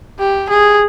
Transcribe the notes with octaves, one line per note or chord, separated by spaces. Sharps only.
G4
G#4